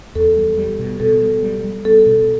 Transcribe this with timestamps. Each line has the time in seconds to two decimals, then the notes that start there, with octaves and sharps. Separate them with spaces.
0.15 E2 A4
0.36 G3
0.58 G3
0.79 B2
1.00 B2 A4
1.22 G3
1.43 G3
1.64 G3
1.85 B3 A4
2.06 B2